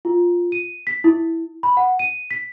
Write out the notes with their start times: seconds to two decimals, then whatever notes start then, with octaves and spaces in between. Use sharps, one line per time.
0.05 F4
0.52 D#7
0.87 B6
1.04 E4
1.63 B5
1.77 F#5
1.99 D#7
2.31 B6